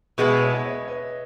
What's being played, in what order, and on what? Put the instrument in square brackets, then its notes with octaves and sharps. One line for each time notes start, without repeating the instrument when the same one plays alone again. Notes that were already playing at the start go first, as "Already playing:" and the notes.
[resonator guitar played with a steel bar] B2 G#3 B3 E4 [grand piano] G#4 B4
[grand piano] C#5 E5
D#5
C#5 E5
B4 D#5